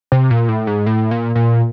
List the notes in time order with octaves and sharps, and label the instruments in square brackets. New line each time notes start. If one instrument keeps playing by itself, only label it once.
[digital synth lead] C3
A#2
A2
G#2
A2
A#2
A#2